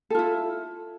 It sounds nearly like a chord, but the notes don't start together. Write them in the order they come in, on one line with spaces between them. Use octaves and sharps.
A4 F4 E4